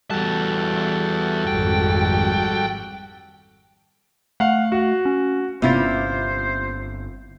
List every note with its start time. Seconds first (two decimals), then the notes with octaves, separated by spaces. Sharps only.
0.10 E2 G3 F#4 A4 A5
1.47 G#1 F2 G5
4.40 A3 F5 F#5
4.72 F#4
5.05 C#4
5.62 G1 C3 A#3 B3 C#4 E4 F4 C5